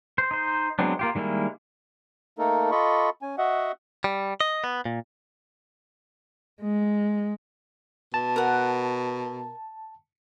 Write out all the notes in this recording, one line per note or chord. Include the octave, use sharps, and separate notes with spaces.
C5
D#4 C5
F#3 G#3 B3 C4 D4
A#3 F4 G4
D#3 G3 G#3 A#3 E4
A3 A#3 D#4 A4 A#4
F4 A4 D#5 B5 C#6
C#4 G#5
F#4 D#5 E5 F#5
G3
D#5
B3
A#2
G#3
B2 A5
A#4 F#5